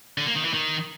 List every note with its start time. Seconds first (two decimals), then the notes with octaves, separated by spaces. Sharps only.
0.18 D3
0.27 A#3
0.36 D#3
0.45 E3
0.54 D#3